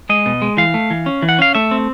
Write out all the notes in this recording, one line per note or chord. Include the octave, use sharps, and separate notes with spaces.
G#3 D#5
B2
G#3
E3 F5
A3
E3
C#4
E3
F#5
C#4 F5
A3 E5
C4